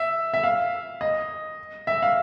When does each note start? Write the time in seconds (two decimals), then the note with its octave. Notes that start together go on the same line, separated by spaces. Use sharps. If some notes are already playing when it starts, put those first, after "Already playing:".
Already playing: E5
0.34 E5
0.43 F5
1.01 D#5
1.87 E5
2.02 F5